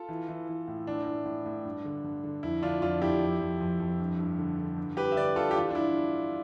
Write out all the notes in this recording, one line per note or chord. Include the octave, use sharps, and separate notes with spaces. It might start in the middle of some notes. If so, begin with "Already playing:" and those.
Already playing: F4 A4
E3
E3
E3
A2
E3 D4
A2
A2
A2
G2
D3
G2
D3
F2 E4
D3 D4 F4
F2 D4 F4
F2 E4 G4
F2
F2
F2
F2
G2
G2
D3
D3
G2
G2 G4 B4
E5
D3 B4 D5
D3 F4 A4
G4
E3 D4 F4
D4
G2 E4